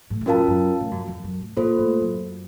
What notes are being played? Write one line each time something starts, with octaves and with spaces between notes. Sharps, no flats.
A2
A2
F#2 C#4 F4 A#4 F5 A5
F#2
A2
F#2
F2
F#2
A2
A#2 A#3 F4 A4 C5
A2
F#2